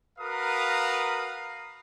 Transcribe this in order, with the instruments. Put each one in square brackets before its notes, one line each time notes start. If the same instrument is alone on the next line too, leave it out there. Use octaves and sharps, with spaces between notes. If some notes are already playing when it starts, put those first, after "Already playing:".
[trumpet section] F#4 A#4 B4 F5 A#5 D#6